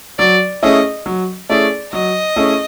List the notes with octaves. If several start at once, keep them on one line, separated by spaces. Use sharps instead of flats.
F#3 D5
A3 C#4 E4 G#4 D#5
F#3
A3 C#4 E4 G#4 D5
F#3 D#5
A3 C#4 E4 G#4